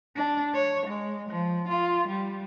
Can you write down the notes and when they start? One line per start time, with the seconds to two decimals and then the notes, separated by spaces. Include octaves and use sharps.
0.16 D4
0.54 C#5
0.86 G#3
1.29 F3
1.69 F4
2.08 G3